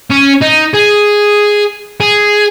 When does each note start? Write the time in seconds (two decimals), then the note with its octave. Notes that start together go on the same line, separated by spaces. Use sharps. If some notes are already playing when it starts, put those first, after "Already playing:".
0.10 C#4
0.41 D#4
0.74 G#4
2.01 G#4